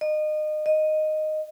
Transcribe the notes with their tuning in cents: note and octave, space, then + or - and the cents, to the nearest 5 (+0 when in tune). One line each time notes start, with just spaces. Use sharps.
D#5 -30
D#5 -10